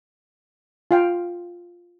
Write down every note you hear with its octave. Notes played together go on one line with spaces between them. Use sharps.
F4 F5 G5